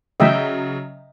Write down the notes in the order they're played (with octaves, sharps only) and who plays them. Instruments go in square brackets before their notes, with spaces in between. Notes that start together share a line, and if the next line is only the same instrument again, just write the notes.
[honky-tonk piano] C#3 F#3 [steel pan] D#5 E5 G5